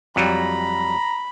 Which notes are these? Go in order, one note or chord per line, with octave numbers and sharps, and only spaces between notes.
F2 F#3 G3 A#5 B5